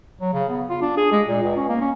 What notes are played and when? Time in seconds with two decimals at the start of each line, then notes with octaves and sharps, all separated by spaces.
0.21 F#3
0.33 C#3
0.49 B3
0.69 F4
0.82 D4
0.97 G#4
1.12 G#3
1.27 A#2
1.43 C#2
1.57 C#4
1.69 A#3
1.81 C#4